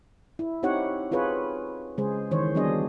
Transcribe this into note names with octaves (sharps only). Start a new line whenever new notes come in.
E4
C4 D#4 E4 G4 C#5 F#5
C4 F4 G#4 B4 C#5
C#3 G#3 G#4 C5
D#3 E3 C5 C#5
F#3 G3 B3 D4 G#4 D#5